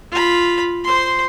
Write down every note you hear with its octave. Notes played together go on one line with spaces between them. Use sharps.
F4 B5
C5 C6